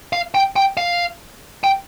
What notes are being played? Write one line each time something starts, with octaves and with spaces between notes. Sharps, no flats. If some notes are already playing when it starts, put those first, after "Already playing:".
F5
G5
G5
F5
G5